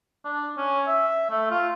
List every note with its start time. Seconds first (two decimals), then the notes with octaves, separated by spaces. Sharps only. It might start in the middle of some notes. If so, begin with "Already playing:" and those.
0.24 D4
0.57 C#4
0.87 E5
1.30 A3
1.51 F4